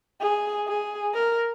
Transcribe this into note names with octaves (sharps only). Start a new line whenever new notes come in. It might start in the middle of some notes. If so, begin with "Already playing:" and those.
G#4
G#4
A#4